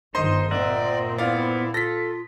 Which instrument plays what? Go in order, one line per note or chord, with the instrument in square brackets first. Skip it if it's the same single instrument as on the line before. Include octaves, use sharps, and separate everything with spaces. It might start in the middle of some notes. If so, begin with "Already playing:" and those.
[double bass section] G1 G2 D#3 [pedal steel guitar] D#4 C5 [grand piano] D#5 C6
[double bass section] A#2 C4 [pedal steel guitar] A#4 E5 F#5 [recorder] D5
[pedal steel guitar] B3 [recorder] E4 [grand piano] D5 F5
[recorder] F4 [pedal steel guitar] A4 [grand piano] A#6 B6